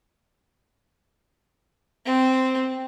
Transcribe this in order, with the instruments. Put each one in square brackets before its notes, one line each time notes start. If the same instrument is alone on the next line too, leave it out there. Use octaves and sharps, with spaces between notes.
[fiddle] C4